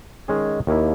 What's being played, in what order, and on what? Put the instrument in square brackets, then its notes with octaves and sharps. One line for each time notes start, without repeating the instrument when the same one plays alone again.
[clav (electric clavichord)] D#3 G#3 C#4 G#4
D#2 D#3 A#3 E4